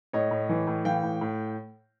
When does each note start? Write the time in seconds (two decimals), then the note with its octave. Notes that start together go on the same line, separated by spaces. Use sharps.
0.13 A2 C#5 D#5
0.31 A2
0.49 E3
0.67 A2
0.85 E3 F5 G5
1.03 A2
1.21 A2